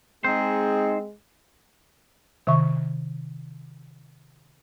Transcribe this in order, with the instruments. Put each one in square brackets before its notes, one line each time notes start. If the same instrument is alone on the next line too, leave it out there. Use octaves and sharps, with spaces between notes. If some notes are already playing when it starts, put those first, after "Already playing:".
[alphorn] G#3 [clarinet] C4 [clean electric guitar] D#4 C5 [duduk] G#4
[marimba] C3 D#3 E5 C#6